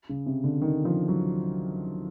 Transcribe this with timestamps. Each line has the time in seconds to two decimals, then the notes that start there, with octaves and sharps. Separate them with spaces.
0.09 C#3
0.26 C3
0.44 D3
0.62 D#3
0.85 F3
1.08 F#3